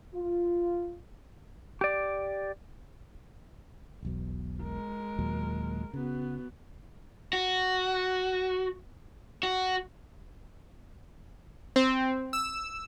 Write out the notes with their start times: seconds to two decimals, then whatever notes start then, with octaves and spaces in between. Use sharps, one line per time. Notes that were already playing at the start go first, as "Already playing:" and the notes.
0.14 F4
1.81 G4 D5
4.03 E1 B1 B2
4.60 G#3 A#4
5.19 D#2 A#2 F#3
5.94 C#3 B3 F#4
7.33 F#4
9.43 F#4
11.76 C4
12.33 E6